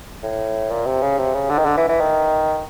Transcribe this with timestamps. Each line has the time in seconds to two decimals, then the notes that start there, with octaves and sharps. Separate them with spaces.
0.23 A2
0.70 A#2
0.86 C3
1.02 C#3
1.18 C3
1.34 C#3
1.50 D3
1.58 D#3
1.65 D3
1.77 E3
1.89 E3
2.00 D#3